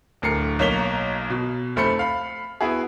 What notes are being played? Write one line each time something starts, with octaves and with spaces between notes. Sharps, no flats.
D1 D2 A#4 C7 C#7
B1 A#3 C#5 B6 F7 G7
B2
F1 A3 C5 B5 C#7
F5 B5
B3 E4 F#4 G#4